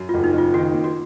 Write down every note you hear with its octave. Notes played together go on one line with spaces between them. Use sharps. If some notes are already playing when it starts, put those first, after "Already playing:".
Already playing: F#2
F#1 F4
D#4
F#1 F4
D#3 F#4
A#3
F#4